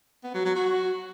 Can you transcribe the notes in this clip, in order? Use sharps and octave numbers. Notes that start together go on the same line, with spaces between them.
B3
F#3
F#3
F#4